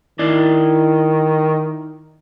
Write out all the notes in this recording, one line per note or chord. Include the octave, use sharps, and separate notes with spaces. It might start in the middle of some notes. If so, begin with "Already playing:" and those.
D#3 E4 D5 D#5